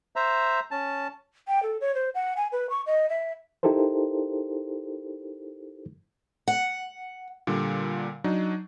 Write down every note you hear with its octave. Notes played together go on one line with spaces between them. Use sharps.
C5 E5 A#5
C#4 A5
G5
A4
C#5
C5
F#5
G#5
B4
C#6
D#5
E5
D#4 E4 G4 A4 A#4 C5
F#5
A#2 D3 G3
F#3 D4 D#4